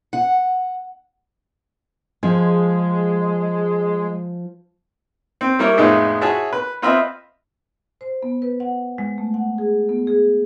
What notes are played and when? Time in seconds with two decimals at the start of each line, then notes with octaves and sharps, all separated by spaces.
0.13 F#5
2.23 F3 G#3
5.41 C4
5.59 G3 A#3 E4 A#4 C#5
5.77 F2 A2 G#3 B3 D#4 E4
6.21 E4 F#4 G#4 C#5 E5 A5
6.53 B4
6.82 C4 F4 B4 D#5 E5 B5
8.01 C5
8.23 B3
8.42 B4
8.60 F#5
8.98 G#3
9.18 A3
9.34 F#5
9.58 G#4
9.89 B3
10.07 G#4